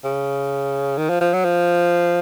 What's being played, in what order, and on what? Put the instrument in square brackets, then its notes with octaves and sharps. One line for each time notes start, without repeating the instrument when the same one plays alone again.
[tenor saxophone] C#3
D#3
F3
F3
F#3
F3